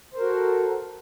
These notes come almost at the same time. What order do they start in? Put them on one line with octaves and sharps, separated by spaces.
C5 A#4 F#4 A4